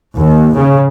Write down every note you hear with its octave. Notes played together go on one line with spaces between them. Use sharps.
D#2
C#3